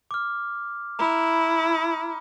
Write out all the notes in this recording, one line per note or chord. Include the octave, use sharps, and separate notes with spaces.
D6 F6
E4 A#5 B5